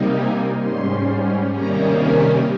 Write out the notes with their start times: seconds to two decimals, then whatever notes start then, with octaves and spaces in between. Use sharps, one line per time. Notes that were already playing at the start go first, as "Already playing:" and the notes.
Already playing: C3 G3 A#3 D#4
0.12 G#5
0.59 G#2 G3 C#4 C6
1.52 C3 D#3 G3 A#3 C#4 A#5
2.00 G#5